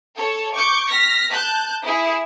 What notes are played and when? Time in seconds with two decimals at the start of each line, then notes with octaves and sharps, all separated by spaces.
0.15 A4 C#5
0.53 C#6 D6 G6 C#7
0.89 F6 A#6 B6
1.29 A5 F#6 G6
1.84 E4 G#4